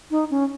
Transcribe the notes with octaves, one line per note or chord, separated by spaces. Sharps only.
D#4
C#4